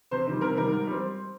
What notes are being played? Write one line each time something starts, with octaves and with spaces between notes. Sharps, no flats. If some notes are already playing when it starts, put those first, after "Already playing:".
C3 C5
D#3 G3
C3 A#4
D#3 G3 A#4
G#2
G3 C4